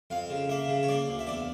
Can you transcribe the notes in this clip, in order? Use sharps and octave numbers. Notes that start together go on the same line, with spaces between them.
F2 F5
C#3
A#3 E5
C#3
C#5
A#3 D5
D2
E5
E2 D5